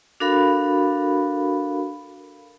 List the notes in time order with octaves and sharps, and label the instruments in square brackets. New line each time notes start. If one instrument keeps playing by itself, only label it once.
[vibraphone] D4 F#4 A4 A#4 F5 B5